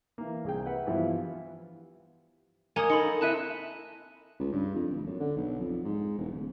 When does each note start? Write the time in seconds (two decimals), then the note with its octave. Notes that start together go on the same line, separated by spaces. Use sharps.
0.18 E3 A#3
0.44 C2 G#4 G5
0.66 B4 E5 F#5
0.87 G2 E3 F3 B3 E4 F4
2.76 A#3 C#5 D#5 G#5 D#6
2.90 D#4 A4 B5 C6 C#7
3.21 C4 E4 E5 A5 F#6 D#7
4.40 C#2
4.52 G2
4.75 F2
4.90 D1
5.06 F#2
5.20 D3
5.37 B1
5.60 F2
5.84 G#2
6.18 E1
6.32 D1